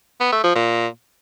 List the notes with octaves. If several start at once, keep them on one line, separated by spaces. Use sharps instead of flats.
B3
A3
F3
A#2